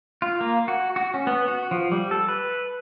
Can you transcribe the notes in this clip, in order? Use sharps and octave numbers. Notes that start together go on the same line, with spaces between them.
F4
A#3
F#4
F#4
C#4
B3
F#4
F3
G3
A4
B4